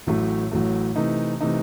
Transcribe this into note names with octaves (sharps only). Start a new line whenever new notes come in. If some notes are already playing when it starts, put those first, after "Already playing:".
A1 A2 F#3 A3
A1 A2 F#3 A3
C3 E3 A3 D#4
C3 E3 A3 D#4